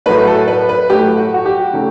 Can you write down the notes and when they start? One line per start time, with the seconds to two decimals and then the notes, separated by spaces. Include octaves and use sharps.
0.06 A2 F#3 A3 B4
0.27 A4
0.48 B4
0.69 B4
0.90 A2 F#3 A3 G4
1.18 F#4
1.34 F#4
1.46 G4
1.73 C#3 F#3 A3